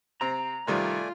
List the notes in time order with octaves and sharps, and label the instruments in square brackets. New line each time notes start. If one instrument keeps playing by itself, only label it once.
[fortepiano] C3 C4 [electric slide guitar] A#5
[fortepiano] C3 D#3 G3 [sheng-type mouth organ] A3 D5 G#5 [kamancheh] F4